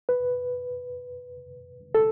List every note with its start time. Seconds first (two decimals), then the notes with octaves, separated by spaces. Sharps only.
0.09 B4
1.95 A4